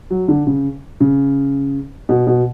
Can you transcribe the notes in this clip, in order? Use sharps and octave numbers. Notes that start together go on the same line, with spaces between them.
F#3
D3
C#3
C#3
B2
B2